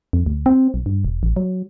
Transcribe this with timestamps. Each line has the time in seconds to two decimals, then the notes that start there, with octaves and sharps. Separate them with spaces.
0.13 F2
0.26 D2
0.46 C4
0.74 B1
0.86 G2
1.05 E1
1.23 A1
1.36 F#3